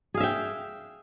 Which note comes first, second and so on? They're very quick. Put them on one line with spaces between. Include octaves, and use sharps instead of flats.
G#4 F5 E5 G5